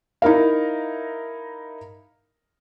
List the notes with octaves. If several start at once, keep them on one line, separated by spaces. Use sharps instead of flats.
D#4 E4 A#4 F5